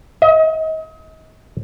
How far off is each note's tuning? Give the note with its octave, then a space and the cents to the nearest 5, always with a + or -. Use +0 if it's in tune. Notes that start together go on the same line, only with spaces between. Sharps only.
D#5 +35